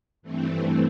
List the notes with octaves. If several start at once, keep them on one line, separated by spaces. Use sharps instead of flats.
G2 E3 A3 C4